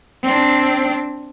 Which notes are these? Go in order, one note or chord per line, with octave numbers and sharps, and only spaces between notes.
C4 D4